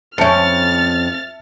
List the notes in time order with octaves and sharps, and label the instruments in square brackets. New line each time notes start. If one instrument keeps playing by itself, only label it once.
[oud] F2 C#4 [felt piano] E5 A5 C#7 [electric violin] F6 A6